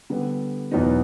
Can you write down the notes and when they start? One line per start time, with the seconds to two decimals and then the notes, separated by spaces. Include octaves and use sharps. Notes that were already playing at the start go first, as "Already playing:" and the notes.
0.10 D3 G3 B3
0.71 E2 B2 F#3 B3 D#4